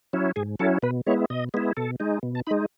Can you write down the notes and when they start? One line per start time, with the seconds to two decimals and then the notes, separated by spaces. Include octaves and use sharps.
0.13 F#3 C#4 E4
0.36 G#2 G#4
0.59 F#3 C#4 E4 A4
0.83 B2 B4
1.06 G#3 B3 E4 C#5
1.30 B2 D#5
1.54 G#3 B3 E4
1.77 B2 A4
2.00 G#3 D#4
2.23 B2
2.35 A5
2.47 G#3 D#4 B5